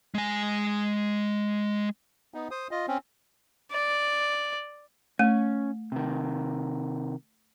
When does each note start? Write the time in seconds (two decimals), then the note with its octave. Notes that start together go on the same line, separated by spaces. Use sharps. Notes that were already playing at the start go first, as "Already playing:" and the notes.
0.15 G#3 G#5
2.34 B3 D#4
2.51 C5 D#6
2.71 F4 D#5
2.88 C4 C#4
3.72 D5
5.19 A3 C#4
5.92 C3 D#3